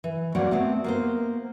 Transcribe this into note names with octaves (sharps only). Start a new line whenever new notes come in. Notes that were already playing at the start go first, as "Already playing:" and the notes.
E3
G3 A#3 C4 F#4 C#5 F#5
A3 B3 C4
A#3 B3 C5